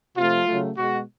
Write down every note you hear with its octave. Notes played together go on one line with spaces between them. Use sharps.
C3 F3 A3 F4
C#3 F#3 A3
B2 G#3 F#4